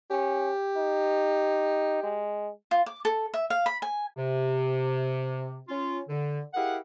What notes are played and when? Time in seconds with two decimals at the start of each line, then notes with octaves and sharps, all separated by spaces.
0.10 C#4 G4
0.76 D#4
2.03 G#3
2.71 F4
2.86 D6
3.05 A4
3.34 E5
3.50 F5
3.66 B5
3.82 G#5
4.17 C3
5.69 C#4 F4
6.09 D3
6.54 E4 G4 G#4 A#4 F5 F#5